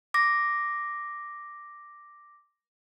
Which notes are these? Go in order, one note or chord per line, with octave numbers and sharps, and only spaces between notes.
D6 A#6